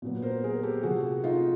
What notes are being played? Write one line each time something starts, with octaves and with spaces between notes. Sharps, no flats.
A#2 F#3 B3
A#4 C5
G#4 A#4
G4 A4
C3 F3 A3 F#4 G#4
D#4 F4